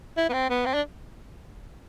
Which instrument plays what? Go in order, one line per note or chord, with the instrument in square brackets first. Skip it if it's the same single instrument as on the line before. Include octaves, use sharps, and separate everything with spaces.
[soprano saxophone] E4
B3
C4
B3
C4
D4